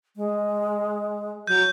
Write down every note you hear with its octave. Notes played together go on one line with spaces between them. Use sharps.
G#3
F#3 G6